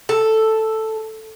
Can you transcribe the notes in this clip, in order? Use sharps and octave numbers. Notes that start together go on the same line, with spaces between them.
A4